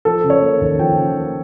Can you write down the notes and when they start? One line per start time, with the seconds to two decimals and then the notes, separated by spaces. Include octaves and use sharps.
0.05 F3 A4
0.24 C#3
0.30 C#5
0.42 A#3
0.61 D#2
0.79 F3 G5
0.98 C#3
1.17 A#3